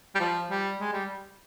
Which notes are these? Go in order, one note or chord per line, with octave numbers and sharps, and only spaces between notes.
G3
F3
G3
G#3
G3